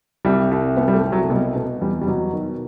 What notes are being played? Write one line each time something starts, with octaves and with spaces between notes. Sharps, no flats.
C2 G3
C2
C2 B3
G3
A3
C2
F#3
A3
B2 G3
B2 A3
E2 G3
G3
B2 F#3
D#3